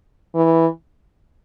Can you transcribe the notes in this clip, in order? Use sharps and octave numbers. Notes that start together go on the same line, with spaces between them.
E3